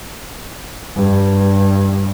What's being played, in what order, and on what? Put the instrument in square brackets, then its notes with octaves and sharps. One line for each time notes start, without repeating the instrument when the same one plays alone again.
[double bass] G2